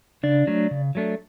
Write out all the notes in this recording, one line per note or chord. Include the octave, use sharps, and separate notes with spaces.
C#3 D4 D5
F#3 A3 D4
C#3
F#3 A3 D4